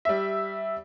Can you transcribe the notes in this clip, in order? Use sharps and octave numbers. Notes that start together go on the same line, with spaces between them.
G3 E5